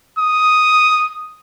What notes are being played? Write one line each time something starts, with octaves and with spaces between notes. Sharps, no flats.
D#6